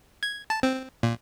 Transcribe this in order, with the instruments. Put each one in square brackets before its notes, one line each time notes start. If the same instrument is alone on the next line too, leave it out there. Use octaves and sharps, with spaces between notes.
[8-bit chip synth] G#6
A5
C4
A#2